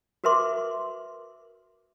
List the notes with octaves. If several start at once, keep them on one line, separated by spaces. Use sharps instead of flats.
F#4 A#4 B4 E5 C6 D6